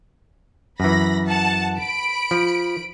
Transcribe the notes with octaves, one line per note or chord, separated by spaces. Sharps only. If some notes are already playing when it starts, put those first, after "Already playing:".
F#2 E3 B5 A#6
F#5 A5
B5 D7
F3